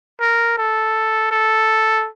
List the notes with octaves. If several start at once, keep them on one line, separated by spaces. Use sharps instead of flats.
A#4
A4
A4